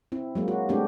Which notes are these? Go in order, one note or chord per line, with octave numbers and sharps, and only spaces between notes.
C4 E4
F#3 G#3 A#3
F#4
G#3 A3 C4 D4 F#4 G4